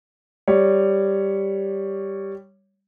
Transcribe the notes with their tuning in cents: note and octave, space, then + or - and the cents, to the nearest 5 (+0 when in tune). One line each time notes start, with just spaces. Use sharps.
G3 +0 C#5 +0